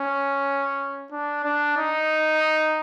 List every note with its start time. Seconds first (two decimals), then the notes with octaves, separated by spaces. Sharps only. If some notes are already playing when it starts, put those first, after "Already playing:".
Already playing: C#4
1.12 D4
1.44 D4
1.77 D#4